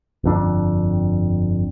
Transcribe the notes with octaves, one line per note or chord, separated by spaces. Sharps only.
G1 F2 D4